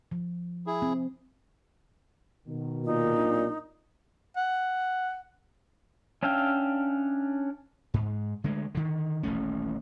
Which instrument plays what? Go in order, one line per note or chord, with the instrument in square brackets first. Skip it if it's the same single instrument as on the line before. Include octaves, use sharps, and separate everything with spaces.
[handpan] F3
[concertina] E4 G#4
[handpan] C4
[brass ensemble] B2 D#3
[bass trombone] A#2 [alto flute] D#4
[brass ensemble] B1 C3 D4
[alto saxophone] F#5
[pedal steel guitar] C#4 D4 E5 F5 G5
[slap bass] G#2
D3 G#3 A3
D3 D#3
D#1 A1 A3 C#4